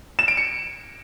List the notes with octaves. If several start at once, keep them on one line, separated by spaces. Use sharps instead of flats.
E7
D7
C#7